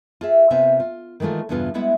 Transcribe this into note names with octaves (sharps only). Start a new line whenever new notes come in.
F4 G#4 E5
C3 B3 C4 F4 E5 G#5
F4
D#3 E3 G#3 A3 F4
E2 G2 C#3 B3 F4
G3 G#3 B3 E4 E5 F#5